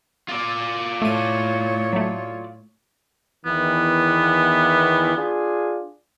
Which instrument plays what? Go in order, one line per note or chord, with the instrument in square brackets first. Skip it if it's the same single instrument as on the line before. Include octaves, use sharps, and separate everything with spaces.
[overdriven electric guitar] F4 D5
[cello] A2 C#5 [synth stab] A3 D#7
[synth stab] F#3 A3
[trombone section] E2 D#3 E3 [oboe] B3
[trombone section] D4 F4 G#4